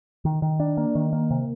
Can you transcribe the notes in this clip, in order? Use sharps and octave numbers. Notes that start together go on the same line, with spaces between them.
D#3
D#3
D4
A#3
D#3
A#3
C3